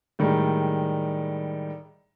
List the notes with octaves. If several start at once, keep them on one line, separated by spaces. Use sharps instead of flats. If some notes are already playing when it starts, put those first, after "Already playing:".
A2 D#3 G3 G#3